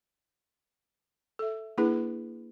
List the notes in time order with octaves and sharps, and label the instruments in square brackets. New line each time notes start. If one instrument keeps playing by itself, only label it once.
[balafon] A4 E5
A#3 D4 E4 G#4 B4